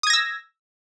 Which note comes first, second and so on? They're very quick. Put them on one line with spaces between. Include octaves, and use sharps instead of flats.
D#6 G#6 A#6 E6